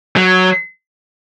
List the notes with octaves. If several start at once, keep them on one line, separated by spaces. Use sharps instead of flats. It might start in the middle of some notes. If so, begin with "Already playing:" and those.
F#3